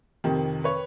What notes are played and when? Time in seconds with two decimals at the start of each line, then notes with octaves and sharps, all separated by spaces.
0.24 F2 C3 D#3
0.64 B4 C#5